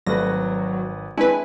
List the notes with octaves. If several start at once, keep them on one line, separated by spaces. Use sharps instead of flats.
G#1 F#3 G3 A3 B4 A#6
G#3 C4 D4 E4 B4 G#5